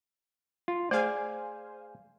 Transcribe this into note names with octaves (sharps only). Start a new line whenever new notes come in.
F4
A3 G#4 C5 D5 F5 G#5